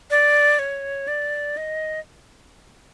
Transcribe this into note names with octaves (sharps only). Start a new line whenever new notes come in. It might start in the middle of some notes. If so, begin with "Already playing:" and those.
D5
C#5
D5
D#5